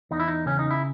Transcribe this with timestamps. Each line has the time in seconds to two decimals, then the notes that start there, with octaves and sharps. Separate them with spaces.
0.11 E2 D#4
0.20 E4
0.28 D#4
0.46 C#3 C#4
0.59 D#4
0.71 E4